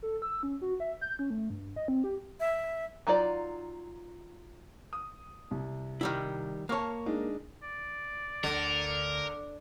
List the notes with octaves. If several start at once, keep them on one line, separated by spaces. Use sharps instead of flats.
A4
E6
C#4
F#4
E5
G6
C#4
A3
G2
D#5
C4
G4
E5
F#3 D#4 F4 D5
D#6
C2
D#3 G3 E4
A#3 C#5 A5 C#6 F6
G#3 D4 D#4
D5
D2 D3 A#4